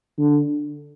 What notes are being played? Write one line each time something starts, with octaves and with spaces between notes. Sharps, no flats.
D3